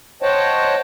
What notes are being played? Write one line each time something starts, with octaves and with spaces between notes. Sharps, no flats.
C5 C#5 D#5 F#5 G5 A5